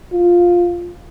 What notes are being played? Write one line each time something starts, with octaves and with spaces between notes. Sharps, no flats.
F4